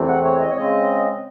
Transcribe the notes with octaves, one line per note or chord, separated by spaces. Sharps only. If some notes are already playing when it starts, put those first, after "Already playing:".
Already playing: E2 C3 E3 A3 C4
F#5
C#5
D#5
C#5
C#3 G#3 C4 D#5